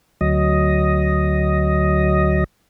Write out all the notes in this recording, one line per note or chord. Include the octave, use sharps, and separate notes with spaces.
D2 F#3 D#5